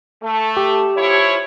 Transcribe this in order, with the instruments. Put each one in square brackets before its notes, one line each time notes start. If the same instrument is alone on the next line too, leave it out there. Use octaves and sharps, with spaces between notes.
[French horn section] A3
[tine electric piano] G4
[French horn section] F3 E4 C#5